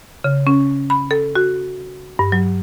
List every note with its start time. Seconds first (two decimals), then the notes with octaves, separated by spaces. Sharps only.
0.24 C#3
0.47 C#4
0.90 B5
1.11 A4
1.36 F#4
2.19 G2
2.32 F#3